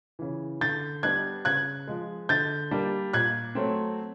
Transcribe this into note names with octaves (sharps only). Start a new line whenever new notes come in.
C#3 E3
D3 G6 A6
G3 B3 D4 F#6 G#6
C#3 F#6 G#6
F3 G#3
D3 G6 A6
G3 A#3 D4
A#2 F#6 G#6
F#3 A3 C4